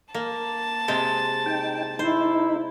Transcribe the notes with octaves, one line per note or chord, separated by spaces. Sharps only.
A#3 A5
C3 G#3 C4
D#4 G5
D#4 E4 C5